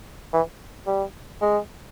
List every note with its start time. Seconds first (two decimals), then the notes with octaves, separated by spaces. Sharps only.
0.33 E3
0.87 G3
1.41 G#3